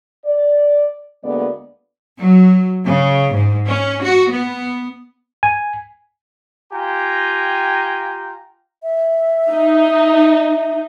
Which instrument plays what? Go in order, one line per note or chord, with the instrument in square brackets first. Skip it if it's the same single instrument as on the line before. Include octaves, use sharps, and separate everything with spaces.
[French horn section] D5
D2 G#3 A#3 B3 D5
[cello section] F#3
C#3
G#2
C#4
F#4
B3
[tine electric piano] G#5
[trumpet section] F4 G4 G5 G#5 A#5
[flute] E5
[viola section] D#4